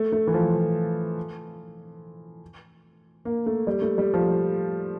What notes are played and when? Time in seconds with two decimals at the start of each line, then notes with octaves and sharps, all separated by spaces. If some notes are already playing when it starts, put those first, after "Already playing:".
Already playing: A3
0.12 A3
0.27 E3
0.34 F3
3.25 A#3
3.46 A3
3.67 G3
3.82 A3
3.98 G3
4.14 F3